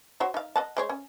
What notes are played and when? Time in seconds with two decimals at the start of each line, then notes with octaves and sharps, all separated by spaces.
0.20 F#4 C5 C#5
0.34 D#4 F5
0.56 D#5 F#5 A5
0.77 G#3 C5 C#5
0.89 C#4